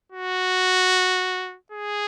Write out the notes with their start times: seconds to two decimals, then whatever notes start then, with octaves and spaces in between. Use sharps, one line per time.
0.12 F#4
1.72 G#4